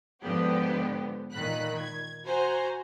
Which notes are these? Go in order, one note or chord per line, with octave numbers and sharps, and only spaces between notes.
G#2 D3 F3 B3 G4
A#2 D#3 B5 F#6
G#6
F#4 C5 G#5 A#5